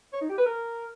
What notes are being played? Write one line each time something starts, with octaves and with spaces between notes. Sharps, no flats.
C#5
D#4
G4
B4
A#4